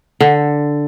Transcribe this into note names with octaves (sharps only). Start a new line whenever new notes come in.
D3